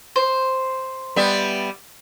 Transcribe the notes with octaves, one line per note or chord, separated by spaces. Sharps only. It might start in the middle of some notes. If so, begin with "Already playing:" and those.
C5
G3 B3 E5